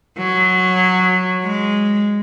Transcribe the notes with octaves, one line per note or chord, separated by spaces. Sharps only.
F#3
G#3